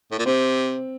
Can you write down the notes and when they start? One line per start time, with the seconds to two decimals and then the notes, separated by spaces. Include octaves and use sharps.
0.12 A2
0.19 A#2
0.26 C3 C4